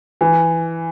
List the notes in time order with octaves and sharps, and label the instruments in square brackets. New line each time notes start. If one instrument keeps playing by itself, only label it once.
[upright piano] E3